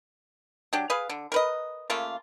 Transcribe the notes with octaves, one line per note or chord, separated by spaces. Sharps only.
F#3 D4 G4
G#4 B4 F5
D3
A#4 B4 D#5
C#3 A3 A#3 F4